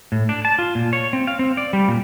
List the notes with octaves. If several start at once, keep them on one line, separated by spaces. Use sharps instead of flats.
A2
D4
A5
F4
A#2
C#5
C4
F5
C4
D5
G3
A#2